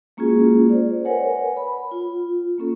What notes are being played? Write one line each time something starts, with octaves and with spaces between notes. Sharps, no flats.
G#3 A#3 C#4 F4 F#4 G#4
C5 D5
A#4 B4 C#5 F#5 G#5
B5
F4
A#3 C#4 A4